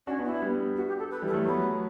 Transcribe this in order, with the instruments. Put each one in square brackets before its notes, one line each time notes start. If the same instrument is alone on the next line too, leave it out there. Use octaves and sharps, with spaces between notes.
[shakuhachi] C#4 [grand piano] D4 F#4
[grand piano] B3 D4
[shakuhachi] E4
[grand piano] G3 B3
[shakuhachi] F#4
G4
A4
B4
[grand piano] E3 G3
[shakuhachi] A4
[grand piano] F#3 A3
[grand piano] F#3 A3 [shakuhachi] B3